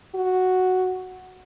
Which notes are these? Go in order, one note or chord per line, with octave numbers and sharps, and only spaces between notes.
F#4